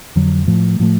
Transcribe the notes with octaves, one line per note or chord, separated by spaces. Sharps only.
F2 D3 F#3
A2 F3 A3
A2 F3 A3